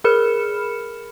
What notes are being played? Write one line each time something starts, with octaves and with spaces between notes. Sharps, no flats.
G#4 A#4 B5 F6 C#7 E7